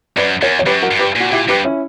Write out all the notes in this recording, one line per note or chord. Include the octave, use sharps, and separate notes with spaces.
F#2 B4 D5
E2 A#4 C#5
C#5
F#2 G4 B4
F#4 A#4
G2
G4 B4
A#2 F#4
A#2 E4 G4
G2 G4 B4
C#4 E4